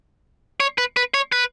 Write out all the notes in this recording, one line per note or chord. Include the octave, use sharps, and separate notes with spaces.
C#5
B4
B4
C#5
B4